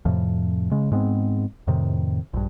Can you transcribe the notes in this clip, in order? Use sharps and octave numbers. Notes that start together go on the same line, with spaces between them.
F2 A2 C3 F3
C#3 G#3
G#2 G#3 B3 C4
F2 A2 C3 D#3
A#1 G2